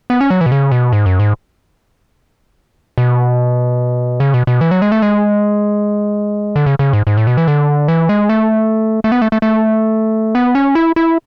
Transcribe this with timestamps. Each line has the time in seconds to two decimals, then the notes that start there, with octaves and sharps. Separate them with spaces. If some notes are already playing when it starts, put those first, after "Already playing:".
0.10 B3
0.21 C#4
0.30 F#3
0.41 E3
0.46 B2
0.52 C#3
0.72 B2
0.93 G#2
1.06 F#2
1.19 G#2
2.98 B2
4.20 C#3
4.34 B2
4.47 B2
4.61 E3
4.71 F#3
4.82 G#3
4.92 A3
5.02 G#3
6.56 D3
6.66 C#3
6.79 C#3
6.93 G#2
7.07 G#2
7.17 A2
7.27 B2
7.37 E3
7.48 D3
7.88 E3
8.09 G#3
8.29 A3
9.04 A3
9.12 B3
9.22 A3
9.32 A3
9.42 A3
10.35 B3
10.55 C#4
10.75 E4
10.96 E4